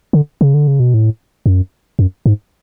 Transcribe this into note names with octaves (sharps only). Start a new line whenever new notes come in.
D3
C#3
D3
C#3
B2
A2
F#2
F#2
G#2